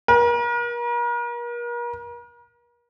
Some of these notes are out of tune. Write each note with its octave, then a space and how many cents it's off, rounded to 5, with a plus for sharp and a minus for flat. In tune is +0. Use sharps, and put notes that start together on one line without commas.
A#4 +40